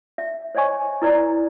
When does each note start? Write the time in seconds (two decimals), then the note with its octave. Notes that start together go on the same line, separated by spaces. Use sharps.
0.18 E5
0.55 C5 C#5 D#5 G#5 C#6
1.02 E4 B4 D5 A#5